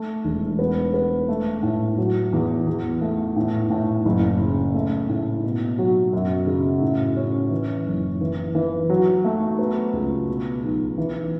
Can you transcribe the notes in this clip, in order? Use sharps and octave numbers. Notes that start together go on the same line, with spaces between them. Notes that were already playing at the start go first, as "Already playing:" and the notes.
Already playing: A3
E1
B3
B3
A3
A2
F#3
E2
E2
A3
A2
A2
F#1
C#3
A3
A2
B2
F#3
F#2
C#3
A2
C#4
E3
F#1
E3
E3
F#3
A3
B3
C#2
B2
B1
E3